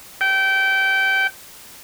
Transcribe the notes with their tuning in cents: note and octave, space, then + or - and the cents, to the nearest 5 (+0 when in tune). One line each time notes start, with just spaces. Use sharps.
G5 -20